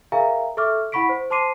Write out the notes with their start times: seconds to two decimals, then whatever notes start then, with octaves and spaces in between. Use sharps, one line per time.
0.12 G#4 A#4 E5 F5 G#5 A#5
0.57 A4 E5 C#6 D6 F6
0.92 E4 F#5 B5 C#6 B6 D7
1.09 C5
1.30 C5 A5 C6 D6 C7 D#7